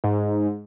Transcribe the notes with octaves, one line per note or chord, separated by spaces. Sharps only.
G#2